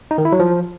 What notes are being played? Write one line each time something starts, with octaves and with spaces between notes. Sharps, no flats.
D#4
D#3
E4
F#3
F3